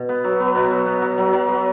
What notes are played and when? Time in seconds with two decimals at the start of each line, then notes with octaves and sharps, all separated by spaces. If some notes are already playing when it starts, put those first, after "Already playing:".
Already playing: B2
0.09 B3
0.24 F#3
0.40 B3
0.55 B2 B4
0.71 F#3
0.86 B3
1.02 F#3
1.18 F#3
1.33 F#3
1.49 B3